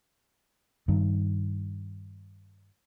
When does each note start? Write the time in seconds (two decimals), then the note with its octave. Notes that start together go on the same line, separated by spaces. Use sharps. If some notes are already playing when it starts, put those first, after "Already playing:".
0.88 G2 D#3